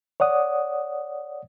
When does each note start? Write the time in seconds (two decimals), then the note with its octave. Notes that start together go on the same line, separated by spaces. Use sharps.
0.20 C#5 D5 F#5 D#6